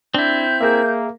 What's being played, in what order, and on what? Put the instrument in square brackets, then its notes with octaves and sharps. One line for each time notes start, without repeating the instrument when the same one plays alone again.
[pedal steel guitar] C4 E4 [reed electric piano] D4 [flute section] G6
[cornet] A#3 [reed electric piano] G#4 A#4 E5